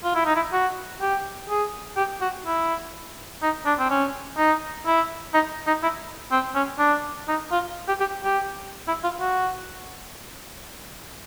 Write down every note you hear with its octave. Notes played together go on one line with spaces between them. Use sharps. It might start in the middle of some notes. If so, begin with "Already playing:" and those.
F4
E4
D#4
E4
F#4
G4
G#4
G4
F#4
E4
D#4
D4
C4
C#4
D#4
E4
D#4
D#4
E4
C4
C#4
D4
D#4
F4
G4
G4
G4
E4
F4
F#4